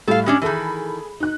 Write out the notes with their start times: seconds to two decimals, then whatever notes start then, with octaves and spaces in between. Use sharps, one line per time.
0.08 A2 G3 A4 F5
0.26 G#3 C#4 D4 G4
0.42 D#3 E3 G#4 A4 B5
1.20 D#4 F#6